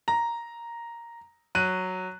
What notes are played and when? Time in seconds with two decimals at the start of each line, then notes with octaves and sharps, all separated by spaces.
0.08 A#5
1.55 F#3 F#6 D#7